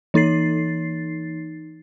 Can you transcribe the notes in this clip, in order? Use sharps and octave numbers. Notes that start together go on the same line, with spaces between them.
E3 D#4 A6 C7